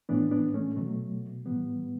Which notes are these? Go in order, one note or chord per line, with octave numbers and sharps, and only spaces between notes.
A2 E3 B3 D4
B3 D4
A3 C#4
B2 F#3 A3
A2 E3 G3 B3